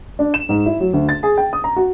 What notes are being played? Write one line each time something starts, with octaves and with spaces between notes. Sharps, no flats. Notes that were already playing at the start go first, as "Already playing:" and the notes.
D4
E7
G#2
E4
F#3
D2
A6
G#4
G5
D#6
A#5
F#4